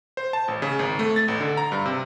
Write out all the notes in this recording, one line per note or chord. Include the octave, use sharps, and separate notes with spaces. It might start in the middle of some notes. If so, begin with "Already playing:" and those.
C5
A5
A1
C#3
G#1
A3
A6
A1
D3
A#5
G2
C3